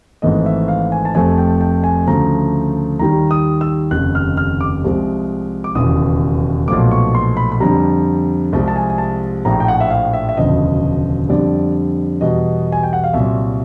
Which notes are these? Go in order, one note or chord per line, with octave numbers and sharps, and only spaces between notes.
G#1 G#2 E3 A3 D#5
E5
F5
G#5
A5
F1 F2 C3 F3 A3 G#5
G5
G5
G#5
D2 C#3 F3 A3 A#5
D#2 D#3 G3 A#5
D#6
E6
F1 D#2 C#3 F#6
F6
F6
D6
C2 C3 F3 G#3
D6
E1 D#2 C#3 E3 D#6
B1 A#2 F3 A3 D6
C#6
C6
B5
B5
F2 D3 G3 A#5
C2 C3 F3 G#3 A5
A5
G#5
G#5
A5
A#1 A2 F3 A#5
G5
F#5
E5
F5
E5
E5
E1 D2 C#3 F3 D#5
F2 D3 G3 D5
E2 B2 G3 D#5
G#5
G5
F#5
F5
C2 A#2 F#3 E5